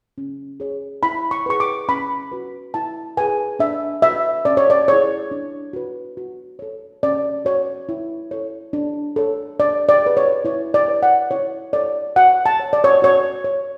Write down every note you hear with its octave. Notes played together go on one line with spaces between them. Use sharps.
C#4
G#4 C#5
E4 B5
C#6
G#4 B4 C#6
D6
C#4 B5
F#4 B4
E4 A5
G#4 B4 G#5
D4 E5
F#4 B4 E5
C#4 D5
C#5
D5
E4 G#4 C#5
D4
F#4 B4
F#4
A4 C#5
C#4 D5
F#4 C#5
E4
A4 C#5
D4
A4 C#5
D4 D5
D5
G#4 B4
C#5
E4 C#5
D5
B4
F#5
E4 C#5
A4 C#5 D5
F#4 F#5
A5
C#5
D5
C#5
F#4 C#5
C#5